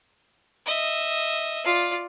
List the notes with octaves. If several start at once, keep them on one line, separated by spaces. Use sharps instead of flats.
D#5 E5
F4 D5